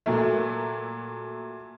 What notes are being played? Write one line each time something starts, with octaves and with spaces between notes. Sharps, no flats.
A#2 F#3 A3